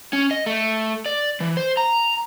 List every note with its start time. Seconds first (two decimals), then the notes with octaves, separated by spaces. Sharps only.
0.13 C#4
0.31 D#5
0.46 A3
1.06 D5
1.40 E3
1.57 C5
1.77 A#5